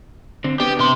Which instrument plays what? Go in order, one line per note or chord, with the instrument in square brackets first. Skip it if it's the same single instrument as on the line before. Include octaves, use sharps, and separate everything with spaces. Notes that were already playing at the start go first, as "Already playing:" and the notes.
[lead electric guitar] D3 C4
[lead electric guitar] B3 D4 [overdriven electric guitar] G4
[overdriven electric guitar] C3 C6